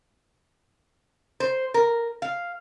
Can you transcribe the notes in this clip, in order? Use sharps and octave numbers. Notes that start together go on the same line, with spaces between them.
C5
A#4
F5